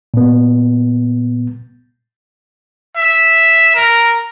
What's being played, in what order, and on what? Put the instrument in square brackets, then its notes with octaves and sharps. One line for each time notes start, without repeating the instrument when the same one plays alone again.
[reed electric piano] A#2 B3
[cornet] E5
A#4